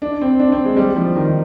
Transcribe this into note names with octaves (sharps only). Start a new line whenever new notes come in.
D4
C4
D4
C4
G#3
G3
F3
D#3